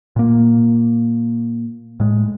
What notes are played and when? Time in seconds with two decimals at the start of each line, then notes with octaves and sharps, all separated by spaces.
0.16 A#2 A#3
2.00 A2 G#3